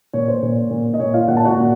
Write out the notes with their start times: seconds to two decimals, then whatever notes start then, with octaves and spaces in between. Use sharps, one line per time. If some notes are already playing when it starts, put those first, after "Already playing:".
0.13 A#2 C#5
0.28 C5
0.42 A#2
0.71 A#2
0.94 D#5
0.99 A#2 C#5
1.14 F4 F5
1.28 A#2 F#5
1.37 A5
1.45 F#4 F#5
1.57 A#2